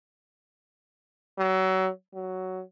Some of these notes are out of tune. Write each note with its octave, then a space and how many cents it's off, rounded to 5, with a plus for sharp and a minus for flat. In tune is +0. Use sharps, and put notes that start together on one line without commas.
F#3 +30
F#3 +5